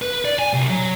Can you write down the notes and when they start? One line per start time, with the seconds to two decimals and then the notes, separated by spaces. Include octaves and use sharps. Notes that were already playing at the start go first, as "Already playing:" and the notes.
0.02 B4
0.25 D5
0.39 G#5
0.53 C2
0.70 F#3